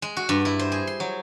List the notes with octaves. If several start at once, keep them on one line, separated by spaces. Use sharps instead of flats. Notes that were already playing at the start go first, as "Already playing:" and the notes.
G#3
F#4
G2
E4
C5
G#4
C6
F#3